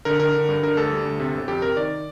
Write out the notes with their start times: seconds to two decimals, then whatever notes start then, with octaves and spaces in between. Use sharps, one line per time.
0.05 D3 A#4
0.20 D3 A#4
0.34 D3
0.49 G2
0.63 D3 A#4
0.77 D2 A4
0.92 G3
1.05 D2
1.20 C3
1.34 G1
1.48 F2 G4
1.62 C3 A#4
1.77 D#3 D5